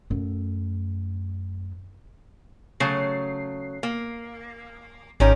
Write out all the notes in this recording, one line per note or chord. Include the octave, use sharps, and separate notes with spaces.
F#2 A3
C#3 F#3 A3 C7
A#3
G#1 D#3 G3 C#4 A#5